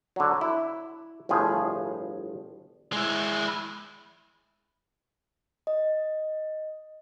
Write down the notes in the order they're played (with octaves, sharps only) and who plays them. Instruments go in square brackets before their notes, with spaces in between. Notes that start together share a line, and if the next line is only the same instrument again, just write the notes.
[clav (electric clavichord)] D3 F#3
E4
G1 A2 F3 G#4
[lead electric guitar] G#3 E4
[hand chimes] D#5